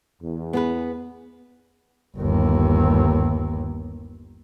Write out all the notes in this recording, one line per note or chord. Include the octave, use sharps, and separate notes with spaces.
E2
B3 G#4 B4
G1 D#2